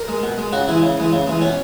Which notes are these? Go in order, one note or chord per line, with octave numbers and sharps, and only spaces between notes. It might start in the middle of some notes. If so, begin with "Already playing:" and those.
Already playing: A#4
G#3
B2
G#3
C#3 F#4
E3 G#3 E4
C#3
E3 G#3
C#3
E3 G#3
B2 C#4